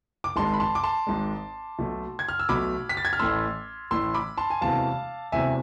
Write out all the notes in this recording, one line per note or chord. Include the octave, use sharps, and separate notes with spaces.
D6
G#1 G#2 G#3 A5 C6
B5
A5 C6
D6
A5 C6
G#1 G#2 G#3
B1 B2 A3
G#6
F6
E6
B1 B2 A3 B5 D6
B6
A6
G#6
F6
A1 A2 E3 A3 C6 E6
A1 A2 E3 A3 C6 E6
B5 D6
A5 C6
G#5
E1 E2 C3 E3 A3 F5 A5
E1 E2 C3 E3 A3 E5 G#5